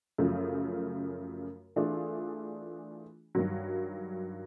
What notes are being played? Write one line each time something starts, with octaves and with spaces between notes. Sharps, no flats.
F#2 C#3 F3 A3
E3 A3 D4 F4 G#4
G2 D#3 F#3